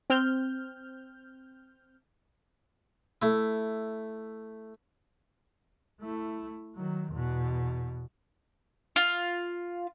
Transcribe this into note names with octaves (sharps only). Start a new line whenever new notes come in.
C4 F6 G6
A3 E4
A3 E4
D#3 F#3
E2 B2
F4